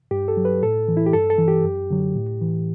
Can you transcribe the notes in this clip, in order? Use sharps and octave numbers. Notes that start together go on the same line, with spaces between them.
G2 G4
A4
F#3
B4
A2 A4
E3
E4
G4
G2 A4
A4
E3
G4
F#2
D3 F#3
A2
E3